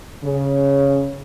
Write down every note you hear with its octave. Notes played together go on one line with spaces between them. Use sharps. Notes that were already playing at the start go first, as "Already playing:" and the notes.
C#3